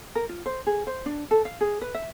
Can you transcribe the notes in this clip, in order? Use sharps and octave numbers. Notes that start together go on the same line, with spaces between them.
A#4
F4
C5
G#4
C5
D4
A4
F5
G#4
B4
E5